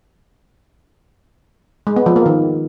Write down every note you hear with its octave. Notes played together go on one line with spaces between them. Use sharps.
G#3
B3
F3
A#3
D#3